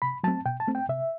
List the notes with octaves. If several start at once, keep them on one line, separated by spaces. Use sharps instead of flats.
C3 B5
F#3 A3 C4 A5
B2 G5
A5
A3 C4
G5
C3 E5